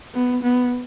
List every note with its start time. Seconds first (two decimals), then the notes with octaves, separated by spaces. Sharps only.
0.14 B3
0.43 B3